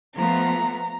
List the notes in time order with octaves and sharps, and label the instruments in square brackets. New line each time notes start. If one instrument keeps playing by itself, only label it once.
[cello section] F3 A3 B3 [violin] A#5